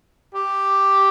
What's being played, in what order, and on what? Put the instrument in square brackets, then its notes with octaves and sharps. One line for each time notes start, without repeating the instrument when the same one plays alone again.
[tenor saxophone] G4